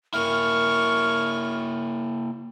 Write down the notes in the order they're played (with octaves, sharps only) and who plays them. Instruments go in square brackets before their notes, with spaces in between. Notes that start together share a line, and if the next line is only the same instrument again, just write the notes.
[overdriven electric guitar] A#3 E4 [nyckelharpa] A#4 C#6 [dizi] F6